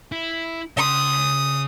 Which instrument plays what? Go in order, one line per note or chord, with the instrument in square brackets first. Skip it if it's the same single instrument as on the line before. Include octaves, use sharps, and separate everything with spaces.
[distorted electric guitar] E4
[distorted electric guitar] C#3 C6 [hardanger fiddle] D#6